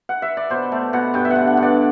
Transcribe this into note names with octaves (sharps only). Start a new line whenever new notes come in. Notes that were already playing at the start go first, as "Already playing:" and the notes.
F#5
E5
D5
B2 C5
A3
B2 F#5
G2 G5
E5
F#5
D3
F#5
G2
D5